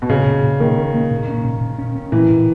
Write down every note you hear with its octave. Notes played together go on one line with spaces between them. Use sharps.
B2
A#2 C#3
A#2
A#2
D#3 A#3
C#4
A#3
A#2
C#4
A#2
A#2
C#4
C#4
A#2 E3
A#2